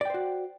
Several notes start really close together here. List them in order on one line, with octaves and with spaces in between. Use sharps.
D5 G5 C5 F#4